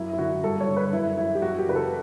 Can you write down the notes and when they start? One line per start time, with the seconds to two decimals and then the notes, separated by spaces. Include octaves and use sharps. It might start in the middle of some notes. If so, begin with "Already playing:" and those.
Already playing: F#2 E4
0.13 E4
0.18 D3 F#4
0.43 G2 A4
0.60 C#5
0.68 D3
0.76 B4
0.93 F#2 E4
1.17 E3 E4
1.35 G4
1.42 F#2 F#4
1.58 G4
1.66 C#3 E3 B4
1.76 A4